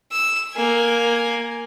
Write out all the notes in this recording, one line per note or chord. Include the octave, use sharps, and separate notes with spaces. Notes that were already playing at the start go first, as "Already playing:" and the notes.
E6
A#3 G#5